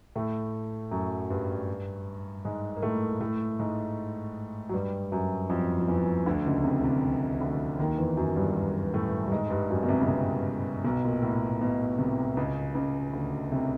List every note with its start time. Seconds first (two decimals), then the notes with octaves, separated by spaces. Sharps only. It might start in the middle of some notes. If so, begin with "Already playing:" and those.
0.16 A2 A3
0.91 F#2 F#3
1.30 G2 G3
2.45 G#2 G#3
2.77 A#3
2.82 A2 A3
3.20 A2 A3
3.59 G#2 G#3
4.69 F#3
4.74 G2 G3
5.12 F#2 F#3
5.50 F2 F3
5.81 F3
5.88 E2 E3
6.26 D2 D3
6.46 C#2 C#3
6.64 C2 C3
6.83 C2 C3
7.40 D2 D3
7.79 D#2 D#3
7.98 E2 E3
8.17 F#2 F#3
8.36 G2 G3
8.94 A2 A3
9.27 G3
9.31 G#2 G#3
9.47 G#3
9.50 G2 G3
9.70 F#2 F#3
9.83 B2
9.88 C2 C3
10.01 C#3
10.08 C2 C3
10.84 B1 B2
11.04 A#2
11.22 A2
11.61 B1 B2
11.98 C2 C3
12.37 C#2 C#3
12.75 C#2 C#3
13.13 D2 D3
13.52 C2 C3